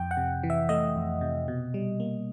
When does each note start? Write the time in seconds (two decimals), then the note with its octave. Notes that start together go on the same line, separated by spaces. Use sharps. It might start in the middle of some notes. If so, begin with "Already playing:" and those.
Already playing: F2 G5
0.11 F#5
0.17 C3
0.43 E3
0.50 E5
0.69 A3 D#5
0.96 F2
1.21 C3
1.48 B2
1.74 G3
2.00 A#3